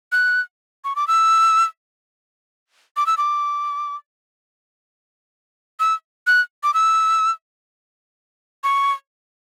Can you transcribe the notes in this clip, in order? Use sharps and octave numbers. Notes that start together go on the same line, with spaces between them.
F#6
C#6
D6
E6
D6
E6
D6
E6
F#6
D6
E6
C#6